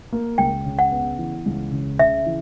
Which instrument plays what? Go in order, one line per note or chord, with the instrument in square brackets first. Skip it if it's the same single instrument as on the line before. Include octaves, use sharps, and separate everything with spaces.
[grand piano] A#3
[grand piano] C#2 [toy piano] G5
[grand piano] C#3
[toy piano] F#5
[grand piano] B3
E3
C#2
C#3
[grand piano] C#3 [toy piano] E5
[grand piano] E3